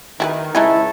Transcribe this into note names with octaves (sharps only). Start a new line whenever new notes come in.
D#3 E4 G#4 B4
C#2 G#3 D#4 E4 G#4 C#5 A5